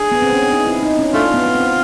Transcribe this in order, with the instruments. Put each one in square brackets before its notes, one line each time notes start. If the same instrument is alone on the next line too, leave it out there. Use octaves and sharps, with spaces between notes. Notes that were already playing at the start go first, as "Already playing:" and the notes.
Already playing: [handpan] D4 [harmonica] G#4
[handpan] B3
C4
C#4
D4
D#4
E4
D#4
C#4
[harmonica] A3 F4 [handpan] D4
[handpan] B3
B3
C4